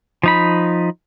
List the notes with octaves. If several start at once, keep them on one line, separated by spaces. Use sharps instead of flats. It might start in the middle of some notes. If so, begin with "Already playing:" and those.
F3 D#4 B5